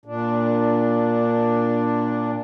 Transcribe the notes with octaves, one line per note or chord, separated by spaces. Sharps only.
A#2 D4